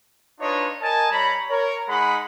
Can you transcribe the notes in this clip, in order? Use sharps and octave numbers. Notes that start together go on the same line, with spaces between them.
D4 D#4 F4 B4 C#5 D#5
A#4 D#5 G#5 A5
G3 C#5 A#5 B5
A#4 C#5
G#3 D#4 F#5 B5